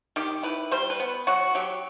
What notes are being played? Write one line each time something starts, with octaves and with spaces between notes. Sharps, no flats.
D#3 G4
E4 B4
G3 C5
B4
B3
F#3 F#4
F#3 G4